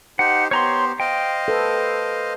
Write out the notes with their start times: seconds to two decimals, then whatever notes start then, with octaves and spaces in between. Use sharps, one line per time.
0.19 D#4 G4 C5 F#5
0.51 B3 G4 C5 C#5 A#5 C6
1.00 C5 D#5 F5 G5
1.48 A4 B4